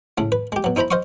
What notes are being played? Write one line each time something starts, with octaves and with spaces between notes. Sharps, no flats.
A2 C#3 A3
B4
G#3 G4
B2 F#3
D#4 E4 C5 A#5 B5
C5 D#5 F5 C6 C#6